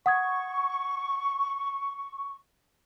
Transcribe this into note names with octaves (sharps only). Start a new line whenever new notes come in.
F#5 C#6 D#6 G#6